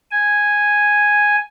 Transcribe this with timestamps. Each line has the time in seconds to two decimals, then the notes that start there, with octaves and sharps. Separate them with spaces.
0.11 G#5